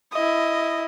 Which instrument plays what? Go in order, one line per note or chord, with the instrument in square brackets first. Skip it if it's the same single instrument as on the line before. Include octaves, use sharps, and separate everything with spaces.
[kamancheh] E4 D#5